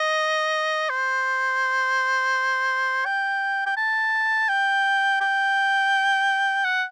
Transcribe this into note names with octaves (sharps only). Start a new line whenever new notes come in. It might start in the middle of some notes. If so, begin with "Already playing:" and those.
Already playing: D#5
C5
G5
G5
A5
G5
G5
F#5